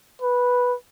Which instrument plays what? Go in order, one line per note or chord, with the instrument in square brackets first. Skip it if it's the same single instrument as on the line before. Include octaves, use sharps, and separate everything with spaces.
[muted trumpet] B4